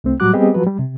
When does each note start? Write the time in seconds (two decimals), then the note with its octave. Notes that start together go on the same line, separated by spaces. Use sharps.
0.04 C2 A3 C4
0.20 A2 F#3 G3 F#4 D6 F#6
0.33 G3 B3 C4 G4 G#4 D#5
0.54 F3 F#3 F#4 B4
0.67 G3
0.79 C3